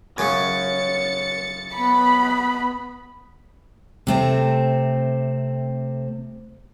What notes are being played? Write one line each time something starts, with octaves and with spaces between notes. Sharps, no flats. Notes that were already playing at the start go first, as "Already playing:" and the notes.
F#2 C#3 A6 C#7
B3 B5
C3 A3 C4